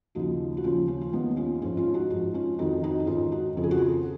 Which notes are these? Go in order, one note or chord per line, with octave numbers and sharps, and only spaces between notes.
D#2 C#3 F3 D#4 F#4
F#4
D#2 C#3 F3 C#4 F4
C#4 F4
F4
D#2 D#3 B3 D#4
C#4 F4
G#2 F3 C#4 F4
C#4 F4
D#4 F#4
G#2 F3 D#4 F#4
C#4 F4
F2 D#3 D#4 F#4
D#4 F#4
D#4
G#2 D#3 C#4 F4
D#4 F#4
F2 C#3 F3
G#4
F#4
F4 G#4